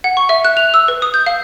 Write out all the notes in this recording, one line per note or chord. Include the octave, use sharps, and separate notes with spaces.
F#5
C#6
E5
F#6
F7
E6
B4
D#6
G6
F5